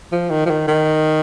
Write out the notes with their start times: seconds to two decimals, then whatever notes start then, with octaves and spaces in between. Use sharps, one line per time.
0.12 F3
0.30 D#3
0.46 F3
0.50 D#3
0.68 D#3